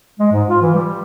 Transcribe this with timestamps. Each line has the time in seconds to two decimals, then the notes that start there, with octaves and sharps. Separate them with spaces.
0.19 G#3
0.31 G#2
0.49 F4
0.62 E3
0.74 G3